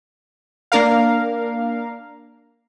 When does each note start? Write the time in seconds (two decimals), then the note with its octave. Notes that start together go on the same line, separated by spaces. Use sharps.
0.72 A#3 D4 A#4 F5